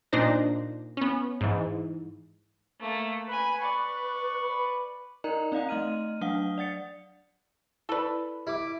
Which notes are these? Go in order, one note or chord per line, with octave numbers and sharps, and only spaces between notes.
A#2 D4 D#4 C5 A#6
B3 C#4
G#2 E3
A3 A#3
B4 G#5 B5
D5 C#6
B4
D#4 A#4 D5 D#5 A#5
C4 D#4 D5 F5 F#5 A#5
A3 D#5 F6 D#7
F#3 D4 F5 F#5 D#6 G7
D5 F#5 A6 C#7
E4 A4 B4 D5
E4 G4 D6